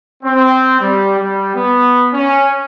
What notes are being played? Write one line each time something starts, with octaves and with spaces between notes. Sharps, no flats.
C4
G3
G3
B3
C#4